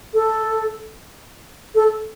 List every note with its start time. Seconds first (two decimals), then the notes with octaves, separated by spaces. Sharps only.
0.14 A4
1.75 A4